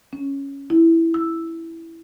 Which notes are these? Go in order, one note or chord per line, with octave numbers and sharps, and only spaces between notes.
C#4
E4
E6